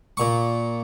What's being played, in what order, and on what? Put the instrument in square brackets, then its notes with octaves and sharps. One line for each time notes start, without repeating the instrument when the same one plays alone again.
[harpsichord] A#2 C#6